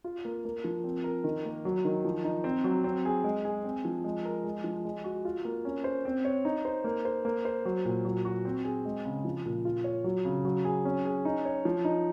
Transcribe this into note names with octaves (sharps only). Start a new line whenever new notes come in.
F4
A#3
A#3
F3
C4
A#4
D#3
A#3
F#3
D#3
F3
D#4
C4
F#3
C4
G#4
G#3
G#4
C4
F3
G#3
A#4
G#3
F3
G#3
F#4
F4
A#3
C#4
C5
C4
C#5
D#4
C5
A#3
C5
A#3
C5
F#3
A#2
F#3
F#4
C4
G#4
G#3
C#3
F3
A#2
F4
C#5
F#3
C#3
F#3
G#4
C#4
G#4
D#4
C#5
F3
D#4